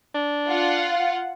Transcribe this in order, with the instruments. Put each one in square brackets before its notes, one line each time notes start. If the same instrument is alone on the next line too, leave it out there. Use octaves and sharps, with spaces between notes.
[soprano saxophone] D4
[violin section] F4 F#5